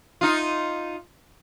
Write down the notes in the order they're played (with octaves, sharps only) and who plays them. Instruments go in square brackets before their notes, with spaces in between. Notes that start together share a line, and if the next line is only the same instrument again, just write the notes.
[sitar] D#4 F4